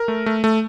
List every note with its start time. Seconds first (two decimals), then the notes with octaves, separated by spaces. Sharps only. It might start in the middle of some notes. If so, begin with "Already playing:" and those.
Already playing: A#4
0.08 A3
0.26 A3
0.44 A3